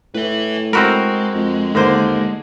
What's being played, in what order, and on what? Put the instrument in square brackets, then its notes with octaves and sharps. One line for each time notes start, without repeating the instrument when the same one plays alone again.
[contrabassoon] A2 [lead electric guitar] B4 E5
[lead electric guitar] G#3 [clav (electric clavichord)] C4 F#4 A#4 [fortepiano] B5
[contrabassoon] F2
[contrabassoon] D#2 [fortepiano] D3 A#3 C5